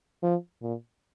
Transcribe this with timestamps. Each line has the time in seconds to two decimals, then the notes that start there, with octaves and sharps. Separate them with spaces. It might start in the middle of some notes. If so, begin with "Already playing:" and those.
0.23 F3
0.62 A#2